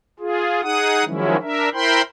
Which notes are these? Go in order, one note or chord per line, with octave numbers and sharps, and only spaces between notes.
F4 G#4
D#4 G#4 F#5 D#6
D#3 F3 F#3 G#3 C#4 E4
D4 A#4 E5
E4 A#4 C5 G5 B5 C6